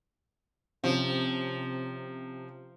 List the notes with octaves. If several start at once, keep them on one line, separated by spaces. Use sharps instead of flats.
C3 F3 C#4